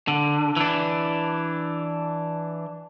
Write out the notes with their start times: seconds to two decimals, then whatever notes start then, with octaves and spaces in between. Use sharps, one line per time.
0.08 D3
0.57 E3 D4